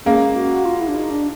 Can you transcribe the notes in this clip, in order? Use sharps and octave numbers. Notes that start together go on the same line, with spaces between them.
G#3 A#3 C#4
F#4
F4
E4
D4
D#4
D4